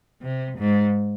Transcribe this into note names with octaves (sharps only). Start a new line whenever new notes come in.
C3
G#2